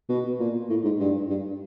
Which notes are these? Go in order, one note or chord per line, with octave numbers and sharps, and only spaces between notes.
B2
A#2
A2
G#2
G2
G2